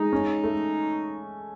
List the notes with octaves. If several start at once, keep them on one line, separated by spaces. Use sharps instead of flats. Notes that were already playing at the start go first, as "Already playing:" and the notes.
Already playing: G#3 D#4
C#4
A3